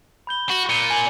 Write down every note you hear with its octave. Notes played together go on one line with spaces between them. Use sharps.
B5 G6 G7
F#4
A#2 C#7 D#7 G7
G#5 F7 F#7